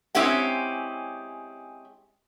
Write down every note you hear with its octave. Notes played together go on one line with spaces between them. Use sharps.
G#3 C4 C#4 E4 G4 F#5